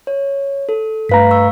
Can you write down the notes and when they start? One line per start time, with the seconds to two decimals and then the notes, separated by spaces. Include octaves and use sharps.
0.07 C#5
0.69 A4
1.09 G2 A3 B4 F5 A#5 B6
1.31 C#6 E6